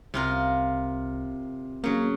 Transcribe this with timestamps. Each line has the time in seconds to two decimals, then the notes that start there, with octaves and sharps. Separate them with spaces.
0.14 C2 C3 F4 A#4
1.84 C#3 F#3 A#3